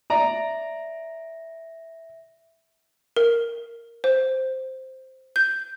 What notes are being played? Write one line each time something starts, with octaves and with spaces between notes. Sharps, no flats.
D5 E5 A#5 A#6
A#4
C5
G6